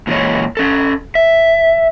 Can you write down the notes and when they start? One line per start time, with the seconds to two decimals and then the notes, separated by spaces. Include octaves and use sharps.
0.07 A#2 E3 G#3 C#5
0.57 C#4 A4
1.15 E5